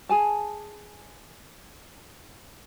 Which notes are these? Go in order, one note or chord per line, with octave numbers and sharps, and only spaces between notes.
G#4 G#5 A5